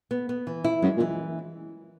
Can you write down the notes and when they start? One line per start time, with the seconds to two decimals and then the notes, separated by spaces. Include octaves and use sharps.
0.11 B3
0.29 B3
0.47 E3
0.64 E4
0.82 F#2 G#3
0.97 A#2
1.00 E3